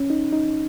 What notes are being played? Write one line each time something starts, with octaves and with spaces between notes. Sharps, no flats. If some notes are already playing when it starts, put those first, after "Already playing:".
Already playing: C#4
D#4
D#4